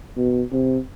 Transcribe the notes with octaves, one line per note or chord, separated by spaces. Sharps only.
B2
C3